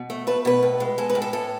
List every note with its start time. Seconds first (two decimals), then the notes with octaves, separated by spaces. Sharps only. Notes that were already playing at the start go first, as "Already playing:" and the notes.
Already playing: B2
0.10 A3
0.27 A3 B4
0.45 B2 B4
0.63 A2
0.80 G#3
0.98 G#3 A4
1.10 B4
1.15 A2
1.22 A4
1.33 A2 A4